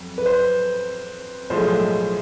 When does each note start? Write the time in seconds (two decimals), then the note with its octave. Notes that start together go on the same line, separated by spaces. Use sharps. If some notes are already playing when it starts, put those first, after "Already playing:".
Already playing: F2 F#3
0.18 B4
0.26 C5
1.50 B1 A2 F3 G#3 C5